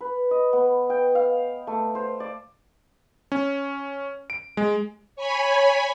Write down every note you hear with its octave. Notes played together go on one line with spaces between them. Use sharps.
B4
D#5
B3
G5
F5
A3
C5
D5
C#4
D7
G#3
C#5 G#5 B5